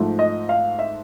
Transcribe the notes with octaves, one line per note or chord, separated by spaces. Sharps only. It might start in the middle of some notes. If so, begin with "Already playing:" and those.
Already playing: G#2 F3 A3
D#5
F5
E5